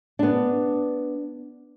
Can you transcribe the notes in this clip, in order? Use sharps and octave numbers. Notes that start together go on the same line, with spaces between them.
B3 D4